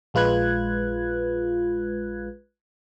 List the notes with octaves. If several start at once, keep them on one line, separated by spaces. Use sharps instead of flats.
A#1 G#3 F4 B4 F#6 G#6